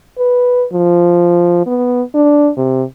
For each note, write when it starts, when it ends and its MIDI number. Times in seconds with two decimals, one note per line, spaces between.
0.18 0.66 71
0.72 1.64 53
1.66 2.02 59
2.14 2.50 62
2.57 2.83 48